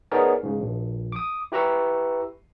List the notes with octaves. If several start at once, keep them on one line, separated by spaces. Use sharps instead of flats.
B3 D#4 G#4 A#4 C#5 D5
G#2 C#3
A#1
D6 D#6
E4 G4 B4 A#5 C#6 E6